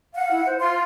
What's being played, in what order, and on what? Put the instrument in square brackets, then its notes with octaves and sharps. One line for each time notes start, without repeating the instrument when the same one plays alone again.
[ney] F5 [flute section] F#5
[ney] E4
C5
[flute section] F4 [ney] C6